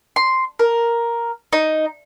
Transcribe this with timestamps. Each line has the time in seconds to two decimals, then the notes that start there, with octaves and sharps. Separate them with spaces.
0.16 C6
0.59 A#4
1.53 D#4